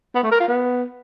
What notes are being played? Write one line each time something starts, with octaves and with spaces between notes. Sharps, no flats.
B3
A3
A#4
F4
B3